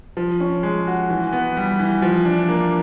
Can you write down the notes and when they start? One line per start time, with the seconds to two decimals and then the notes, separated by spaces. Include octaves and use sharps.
0.17 F3
0.40 C#4
0.63 G#3
0.87 F#4
1.10 E3
1.32 B3
1.57 G3
1.79 E3
2.02 F3
2.25 D4
2.48 A#3